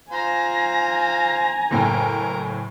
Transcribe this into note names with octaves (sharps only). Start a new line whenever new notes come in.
F4 C5 G#5 A#5
F#1 A2 A#4 G5